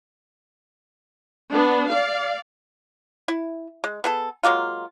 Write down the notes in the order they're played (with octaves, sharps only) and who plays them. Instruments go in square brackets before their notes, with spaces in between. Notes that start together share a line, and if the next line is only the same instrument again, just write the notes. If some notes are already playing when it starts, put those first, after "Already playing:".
[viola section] B3 D4
D5 F5
[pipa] E4
G#3
B3 G#4 A4
F#3 G#3 A#3 F4